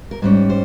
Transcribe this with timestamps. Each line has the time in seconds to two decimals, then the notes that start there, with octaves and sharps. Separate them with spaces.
0.11 A#4
0.22 G#2 G3 C#4 C5
0.50 C5